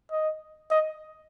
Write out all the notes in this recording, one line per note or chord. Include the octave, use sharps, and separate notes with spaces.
D#5
D#5